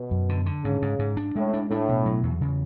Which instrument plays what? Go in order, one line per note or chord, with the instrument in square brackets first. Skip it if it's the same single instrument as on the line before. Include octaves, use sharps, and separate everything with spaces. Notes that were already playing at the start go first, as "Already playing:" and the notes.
Already playing: [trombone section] B2
[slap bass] F#2
D3
D3
[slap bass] G#2 [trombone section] C#3
[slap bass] G#2
G#2
D4
[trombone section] A2 [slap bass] G#3
[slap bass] D4
[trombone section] A2 [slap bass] D4
[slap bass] B2
F#3
E2
C#3